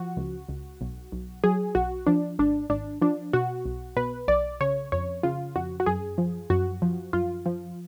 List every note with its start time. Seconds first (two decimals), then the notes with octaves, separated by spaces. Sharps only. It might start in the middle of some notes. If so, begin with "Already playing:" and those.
Already playing: F3 F#4
0.17 C#2
0.49 C#2
0.81 B1
1.12 B1
1.44 F#3 G#4
1.75 B1 F#4
2.07 F3 D4
2.39 G#1 D4
2.70 G#1 D4
3.01 F3 D4
3.33 B2 F#4
3.65 B1
3.97 B2 B4
4.28 B1 D5
4.61 C#3 C#5
4.92 F2 C#5
5.23 C#3 F4
5.56 F2 F#4
5.80 F#4
5.86 F#2 G#4
6.18 F3
6.50 F#2 F#4
6.82 F3
7.13 F#2 F4
7.46 F3